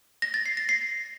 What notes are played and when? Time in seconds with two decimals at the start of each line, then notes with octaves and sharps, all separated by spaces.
0.22 A#6
0.34 A6
0.46 C7
0.57 A#6
0.69 C7